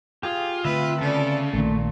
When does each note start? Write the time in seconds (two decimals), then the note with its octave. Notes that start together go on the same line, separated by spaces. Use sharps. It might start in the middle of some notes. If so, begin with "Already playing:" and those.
0.23 F4 G4 G#4 F5
0.65 D3 A3 C4 B4 E5
1.01 C#3 A4 D5
1.53 A#1 A#2 D#3 A3